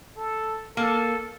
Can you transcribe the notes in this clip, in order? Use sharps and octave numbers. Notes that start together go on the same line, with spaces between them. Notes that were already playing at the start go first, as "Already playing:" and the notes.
A4
A#3 A4